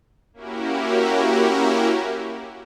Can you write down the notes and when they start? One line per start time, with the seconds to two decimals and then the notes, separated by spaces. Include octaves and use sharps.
0.34 A#3 C#4 E4 F#4 G4 A#4